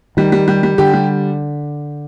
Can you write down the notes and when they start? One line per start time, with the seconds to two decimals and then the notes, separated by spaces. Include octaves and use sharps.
0.17 D#3 G3
0.32 G3
0.48 G3
0.63 G3
0.78 D3 G4
0.93 G3